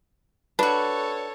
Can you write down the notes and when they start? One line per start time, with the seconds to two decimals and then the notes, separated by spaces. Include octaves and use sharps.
0.59 D4 F#4 A4 B4 C#5